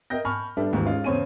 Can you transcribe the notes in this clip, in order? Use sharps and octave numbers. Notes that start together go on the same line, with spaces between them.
A#4 D#5 E5 G5 G6 A#6
G#5 A5 B5 C#6 F6
G3 B3 D4 A4 E5 G5
D#2 G#2 E3
G#3 C#4 D#4 F4
E2 C#3 C5 C#5 G#5 D#7